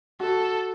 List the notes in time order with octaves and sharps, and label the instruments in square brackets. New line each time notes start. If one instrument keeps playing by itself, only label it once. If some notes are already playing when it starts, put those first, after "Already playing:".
[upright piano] F#4 [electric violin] A4